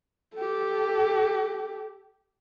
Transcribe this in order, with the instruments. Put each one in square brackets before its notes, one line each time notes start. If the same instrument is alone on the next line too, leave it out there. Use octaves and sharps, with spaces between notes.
[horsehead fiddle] G4 A4